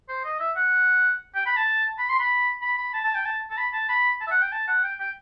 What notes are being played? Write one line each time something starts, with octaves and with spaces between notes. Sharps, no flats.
C5
D#5
E5
F#5
G5
B5
A5
B5
C6
B5
B5
B5
A5
A5
G5
A5
A5
B5
A5
B5
A5
E5
F#5
G5
A5
F#5
G5
G5